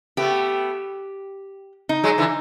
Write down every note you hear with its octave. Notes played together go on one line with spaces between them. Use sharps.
A3 B3 G4
D#4
F#3 G#3
D3 E3